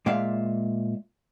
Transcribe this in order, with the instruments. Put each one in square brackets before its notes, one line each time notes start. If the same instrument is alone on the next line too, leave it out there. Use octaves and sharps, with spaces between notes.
[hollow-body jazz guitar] A#2 G#3 D5 E5 F5